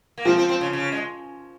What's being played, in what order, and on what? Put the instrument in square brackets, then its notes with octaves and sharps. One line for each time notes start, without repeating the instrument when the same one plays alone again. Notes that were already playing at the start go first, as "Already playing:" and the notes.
[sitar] A#3
[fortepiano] F3 [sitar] C4
[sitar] C4
C4
C#3
C#3
G#3